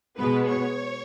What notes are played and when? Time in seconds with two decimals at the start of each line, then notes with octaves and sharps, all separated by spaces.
0.18 B2 G#3 B3 B4
0.48 C#5